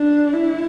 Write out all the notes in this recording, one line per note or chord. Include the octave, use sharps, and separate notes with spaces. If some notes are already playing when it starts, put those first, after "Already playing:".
Already playing: D4
E4